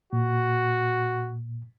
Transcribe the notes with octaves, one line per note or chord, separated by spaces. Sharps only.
A#2 F#4